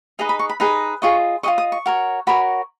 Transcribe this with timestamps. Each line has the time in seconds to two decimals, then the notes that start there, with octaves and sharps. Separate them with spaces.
0.19 D#4 G#4 B4 D#5 A#5
0.29 B5
0.39 C#6
0.50 B5
0.60 D#4 G#4 B4 D#5 B5
1.02 F4 G#4 D#5 C#6
1.43 F4 G#4 D#5 C#6
1.58 D#6
1.72 C#6
1.86 F#4 A#4 C#5
2.27 F#4 A#4 C#5 B5